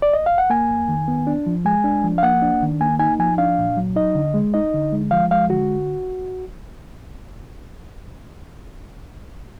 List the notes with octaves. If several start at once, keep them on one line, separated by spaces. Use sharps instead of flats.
D5
D#5
F5
F#5
A#3 G#5
F2
D#3
B3
D4
F3
G#3 G#5
D4
F3
F5
A#3 F#5
D4
D#3
A#3 G#5
D#4 G#5
F3 G#5
D4 F5
A#2
F#3
D#4 D#5
D3
G#3
D#4 D#5
D3
G#3
F3 F5
G#3 F5
D3 F#4